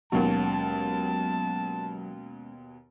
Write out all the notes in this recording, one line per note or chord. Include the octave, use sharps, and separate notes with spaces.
D#2 B2 F#3 G#3 C#4 A5